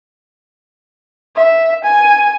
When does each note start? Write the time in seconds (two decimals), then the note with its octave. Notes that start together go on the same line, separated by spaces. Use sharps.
1.36 E5
1.84 G#5